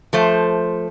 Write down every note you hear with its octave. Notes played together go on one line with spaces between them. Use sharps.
F3 A3 C5